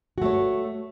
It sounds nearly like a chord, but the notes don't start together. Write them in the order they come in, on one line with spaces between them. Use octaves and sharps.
F#4 A3 C#5